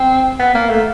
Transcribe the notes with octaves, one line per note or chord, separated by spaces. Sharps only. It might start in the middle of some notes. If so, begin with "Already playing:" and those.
Already playing: C4
B3
A#3
A3